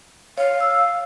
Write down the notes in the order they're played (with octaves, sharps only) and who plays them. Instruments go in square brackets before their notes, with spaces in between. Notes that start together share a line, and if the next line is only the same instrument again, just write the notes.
[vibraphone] C#5 [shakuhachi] F5
[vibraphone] E6